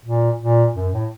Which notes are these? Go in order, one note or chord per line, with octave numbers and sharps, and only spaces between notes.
A#2
A#2
F#2
A2